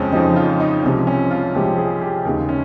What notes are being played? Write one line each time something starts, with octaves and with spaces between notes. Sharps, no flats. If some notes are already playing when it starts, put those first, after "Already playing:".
Already playing: F2 C#3 F3 G#3 C4 C#4
F2 C#3 F3 G#3 D#4
F4
D#4
C2 C3 F3 G#3 C#4
C#4
F4
C2 C3 F3 G#3 G4
G#4
G4
D#2 C#3 G#3 G4
C#4